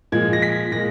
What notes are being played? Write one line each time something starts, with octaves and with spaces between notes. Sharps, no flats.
A#2 F3 G#3 G#6
A#6
B6
A#2 G#3 A#6